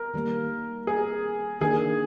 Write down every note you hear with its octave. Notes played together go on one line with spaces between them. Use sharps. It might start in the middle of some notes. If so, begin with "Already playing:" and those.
Already playing: A#4
D#3 G3 A#3
G#4
D#3 A#3 D4 G#4